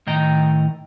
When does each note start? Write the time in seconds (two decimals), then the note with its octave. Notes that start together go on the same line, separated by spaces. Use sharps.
0.07 A2 D#3 D#5 G5 A#5